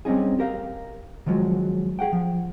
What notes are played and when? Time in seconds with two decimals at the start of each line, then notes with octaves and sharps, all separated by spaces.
0.05 G3 C4 C#4 D#4 G#4
0.39 G4 A#4 F5
1.26 D#3 F3 F#3 G#3
1.99 G#4 F#5 G5
2.13 F3